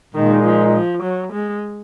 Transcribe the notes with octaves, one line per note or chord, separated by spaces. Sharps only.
A#2 D#3 G#3 D#4
F3
F3
F#3
G#3